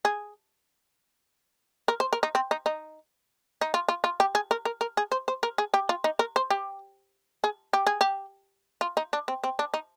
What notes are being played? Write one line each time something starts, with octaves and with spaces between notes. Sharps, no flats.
G#4
A#4
C5
A#4
D#4
C4
D#4
D#4
D#4
F4
F4
F4
G4
G#4
A#4
A#4
A#4
G#4
C5
C5
A#4
G#4
G4
F4
D#4
A#4
C5
G4
G#4
G4
G#4
G4
F4
D#4
D4
C4
C4
D4
D#4